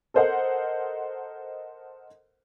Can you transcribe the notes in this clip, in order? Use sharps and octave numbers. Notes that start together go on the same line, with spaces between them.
A4 A#4 C5 D#5 F#5